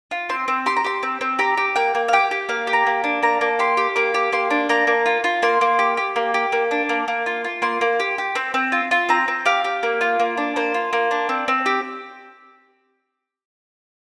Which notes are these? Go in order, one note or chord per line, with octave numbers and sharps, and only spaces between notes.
F4
C4 C6
C4
G4 C6
A#5
G4 C6
C4
C4
G4 A#5
G4
A#3 G5
A#3
F5
G4 G5
G4
A#3 F5
G4
A#5
A#3
D4
A#3 A#5
A#3
G4 C6
G4
A#3 D6
G4
A#3 C6
D4
A#3 A#5
A#3
F4
F4
A#3 C6
A#3
G4
G4
A#3
G4
A#3
D4
A#3
A#3
F4
F4
A#3 C6
A#3
G4
G4
C4
C4
F4
F4
C4 A#5
C4
G4 F5
G4
A#3
F4
A#3
D4
A#3 C5
F4
A#3
D4
C4
C4
G4